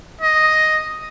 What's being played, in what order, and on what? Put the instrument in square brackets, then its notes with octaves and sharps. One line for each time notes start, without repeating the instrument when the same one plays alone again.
[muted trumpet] D#5